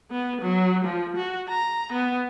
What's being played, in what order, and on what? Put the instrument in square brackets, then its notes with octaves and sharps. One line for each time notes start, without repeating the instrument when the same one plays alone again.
[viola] B3
F#3
F3
F#4
A#5
B3